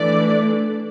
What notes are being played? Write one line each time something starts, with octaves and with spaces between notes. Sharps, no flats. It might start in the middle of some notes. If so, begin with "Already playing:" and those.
Already playing: E3 A3 D4 D5